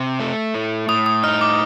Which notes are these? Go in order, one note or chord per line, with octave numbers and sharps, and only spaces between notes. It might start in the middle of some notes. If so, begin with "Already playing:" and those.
Already playing: C3
A3
A2
A2 D#6
D#6
D#4 F6
D6